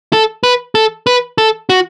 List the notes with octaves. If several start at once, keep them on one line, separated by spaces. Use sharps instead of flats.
A4
B4
A4
B4
A4
F#4